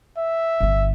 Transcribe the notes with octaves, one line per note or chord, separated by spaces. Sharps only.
E5
G1 D3